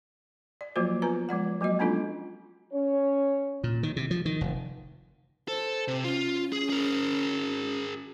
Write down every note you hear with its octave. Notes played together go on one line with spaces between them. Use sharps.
D5
F3 F#3 A#3 F4 F#4 C5
B3 F4 B4 A#5
F3 G#3 D5 F#5
F#3 A#3 F#4 D#5
G#3 B3 C#4 D4 F4 A4
C#4 C#5
A#2
D#3
C3
F3
D#3
F1
A4 C5
C3
C#4 F4
G#4
G#4 A#4